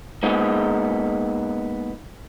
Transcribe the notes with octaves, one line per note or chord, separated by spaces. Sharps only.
G#3 A#3 B3 D#4